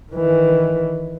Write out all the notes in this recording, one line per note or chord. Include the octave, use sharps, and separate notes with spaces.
D#3 E3